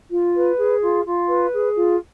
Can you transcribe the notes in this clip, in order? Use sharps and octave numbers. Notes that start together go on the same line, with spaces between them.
F4
B4
G#4
F4
F4
B4
G#4
F4